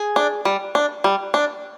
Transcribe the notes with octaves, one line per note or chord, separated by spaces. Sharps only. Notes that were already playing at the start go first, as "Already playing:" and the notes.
Already playing: G#4
D4
G3
D4
G3
D4